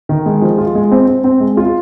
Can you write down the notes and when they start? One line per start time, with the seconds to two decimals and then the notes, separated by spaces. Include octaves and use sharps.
0.09 D#3
0.26 G#3
0.42 F3
0.58 F4
0.75 G#3
0.91 C4
1.08 C4
1.24 C4
1.40 G#3
1.57 F4